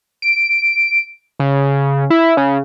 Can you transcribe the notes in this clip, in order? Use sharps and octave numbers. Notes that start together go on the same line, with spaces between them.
D7
C#3
E4
C#3